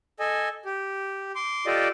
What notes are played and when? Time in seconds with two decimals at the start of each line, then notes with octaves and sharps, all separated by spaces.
0.20 A4 D#5 G#5
0.65 G4
1.35 C6 D6
1.66 F4 G4 A4 D5 D#5